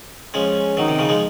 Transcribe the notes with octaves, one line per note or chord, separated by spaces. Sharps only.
F3 G#3 C#4
D#3 F#3 D#4
C3 D#3
C#3 F3
F3 G#3